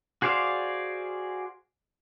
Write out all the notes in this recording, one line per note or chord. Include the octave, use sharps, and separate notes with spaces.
F#4 G#4 C5 D5 F5